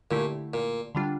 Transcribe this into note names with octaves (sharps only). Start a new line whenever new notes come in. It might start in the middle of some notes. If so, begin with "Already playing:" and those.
A#2 D3 A3 E4 G4
A#2
D3 G3 D4 F4